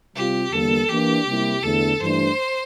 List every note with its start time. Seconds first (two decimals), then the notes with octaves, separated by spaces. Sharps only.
0.15 C3 G3 C4 F4 G4
0.52 E2 D3 G3 A#3 A4
0.89 E3 A#3 D4 G4
1.27 C3 G3 A#3 E4
1.63 E2 D3 A3 A4
2.00 G2 E3 A3 D4 C5